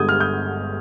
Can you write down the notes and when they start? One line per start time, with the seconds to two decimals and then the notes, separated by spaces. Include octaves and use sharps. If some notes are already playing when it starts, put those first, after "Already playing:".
Already playing: G1 G2 D3 G#3 D#6 G6 G#6
0.09 F6
0.20 D#6 G6